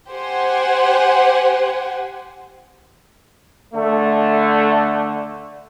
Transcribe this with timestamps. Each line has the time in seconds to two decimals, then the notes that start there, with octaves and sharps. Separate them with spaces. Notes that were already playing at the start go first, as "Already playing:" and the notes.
0.10 G4 C5 F#5 G#5
3.74 D3 A3